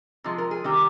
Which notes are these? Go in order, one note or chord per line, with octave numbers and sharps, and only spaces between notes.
C3 F3 G#3
A#4
G#4
C3 D#3 G3 G4